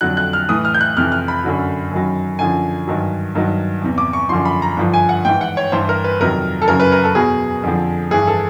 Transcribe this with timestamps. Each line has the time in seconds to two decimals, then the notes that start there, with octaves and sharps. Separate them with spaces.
0.01 F2 D3 F#3 F#6
0.17 F#6
0.33 F6
0.49 A2 E3 D#6
0.65 F6
0.74 G6
0.81 F#6
0.97 F2 C3 E3 F6
1.12 F6
1.28 B5
1.44 F#2 D3 F#3
1.91 F#2 D#3 F#3
2.39 F#2 D3 F3 G#5
2.88 G2 D#3 F#3
3.35 G2 D#3 F#3
3.82 E2 C3 E3
3.98 D6
4.13 C#6
4.29 F#2 D3 F3 C6
4.45 B5
4.62 A#5
4.77 G2 D3 F3
4.94 G#5
5.09 F#5
5.25 G#2 E3 G5
5.41 F#5
5.57 C#5
5.72 G2 E3 C5
5.89 A#4
6.04 B4
6.20 F2 C3 D#3 F#3 A#4
6.62 A4
6.68 F#2 C#3 F#3 A#4
6.80 B4
6.92 A#4
7.04 A4
7.15 E2 B2 F#3 G#4
7.63 F2 D3 F3
8.11 G2 E3 G#4
8.27 A4